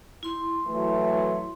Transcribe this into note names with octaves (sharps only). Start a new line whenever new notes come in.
E4 C6
E3 F#3 A3